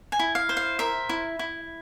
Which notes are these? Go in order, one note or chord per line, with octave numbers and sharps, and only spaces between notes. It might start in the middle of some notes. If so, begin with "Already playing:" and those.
G#5
E4
F5
C5
F5
A#4 E5
E4
E4